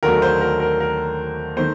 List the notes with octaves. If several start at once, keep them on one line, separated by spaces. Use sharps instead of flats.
D#2 D3 F#3 A3 A#4
C5
A#4
A#4
A#4
D#3 A3 C5